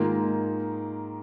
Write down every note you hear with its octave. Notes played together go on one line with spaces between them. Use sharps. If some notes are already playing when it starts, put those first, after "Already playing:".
Already playing: G#2 D#3 A#3 F4